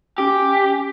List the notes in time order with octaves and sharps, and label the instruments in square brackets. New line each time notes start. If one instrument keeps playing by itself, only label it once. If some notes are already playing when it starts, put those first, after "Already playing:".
[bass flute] C#4 [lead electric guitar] G4